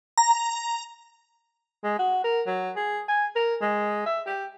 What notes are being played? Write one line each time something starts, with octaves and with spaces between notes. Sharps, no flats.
A#5
G#3
F#4
A#4
F#3
G#4
G#5
A#4
G#3
E5
G4